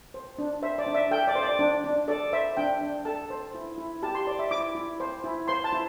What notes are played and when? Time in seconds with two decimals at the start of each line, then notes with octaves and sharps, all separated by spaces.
0.14 C5
0.38 D4
0.63 C5 E5
0.78 D5
0.87 D4
0.95 E5
1.11 A4 G5
1.27 D5
1.35 C5
1.43 D5
1.59 D4
1.84 D4
2.08 A4 D5
2.33 C5 E5
2.57 D4 G5
2.81 D4
3.05 A4 A5
3.30 C5
3.55 E4
3.78 E4
4.03 G4 A5
4.15 C6
4.27 C5 D5
4.39 E5
4.51 E4 D6
4.75 E4
5.00 C5
5.24 E4
5.48 C5 C6
5.64 A5
5.73 E4